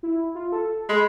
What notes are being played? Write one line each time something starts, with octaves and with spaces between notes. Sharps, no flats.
E4
F4
A4
G#3 B5